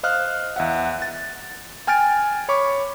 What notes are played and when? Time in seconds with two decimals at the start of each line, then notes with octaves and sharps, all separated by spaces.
0.03 C5 D#5 F5 F6 F#6
0.56 E2 E5 F#5
1.02 A6
1.87 G5 G#5 F6 G#6 A6 D7
2.49 C#5 B5 C#6 D6